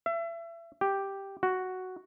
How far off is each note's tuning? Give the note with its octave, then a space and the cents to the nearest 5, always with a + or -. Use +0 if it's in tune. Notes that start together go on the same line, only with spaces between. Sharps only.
E5 +30
G4 +0
F#4 +0